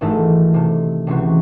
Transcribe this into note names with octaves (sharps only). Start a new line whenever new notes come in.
G#1 G#2 E3 A3 D#4
C3 D#3 A3
C#2 C3 E3 C4 F#4